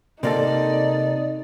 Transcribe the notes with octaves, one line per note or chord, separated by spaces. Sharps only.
C3 A#3 D#4 A4 D5